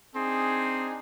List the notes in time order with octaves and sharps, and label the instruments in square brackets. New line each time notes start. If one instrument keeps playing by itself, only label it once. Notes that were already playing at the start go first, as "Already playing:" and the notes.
[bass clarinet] C4 [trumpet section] D4 D#4 G#4